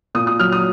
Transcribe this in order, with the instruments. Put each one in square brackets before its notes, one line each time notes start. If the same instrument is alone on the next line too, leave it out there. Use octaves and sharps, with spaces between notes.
[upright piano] A#2 D#6
D#6
F#3 F6
D#6